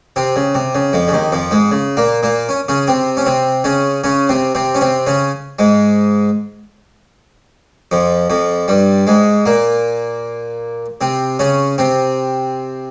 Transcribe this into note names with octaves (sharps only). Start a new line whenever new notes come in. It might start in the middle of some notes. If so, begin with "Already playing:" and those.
C3 C4
C#3
C3
C#3
F2 F3
C#3
D#2 D#3
F2 F3
G#2 G#3
C#3
A#2 A#3
A#2 A#3
C#4
C#3 C#4
C3 C4
C#4
C3 C4
C#3 C#4
C#3 C#4
C3 C4
C3 C4
C#4
C3 C4
C#3 C#4
G#2 G#3
F2 F3
F2 F3
G2 G3
G#2 G#3
A#2 A#3
C3 C4
C#3 C#4
C3 C4